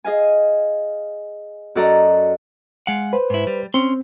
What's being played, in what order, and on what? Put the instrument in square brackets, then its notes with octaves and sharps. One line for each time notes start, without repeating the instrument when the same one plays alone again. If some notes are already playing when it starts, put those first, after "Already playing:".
[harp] G#4 D#5 F5 G#5
F#2 F#4 A4 D5 D#5 A#5
[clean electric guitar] G#3 F5 F#5
[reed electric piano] B4 C5
[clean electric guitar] G#2 E4
G3
[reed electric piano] C4 [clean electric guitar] C#4 C6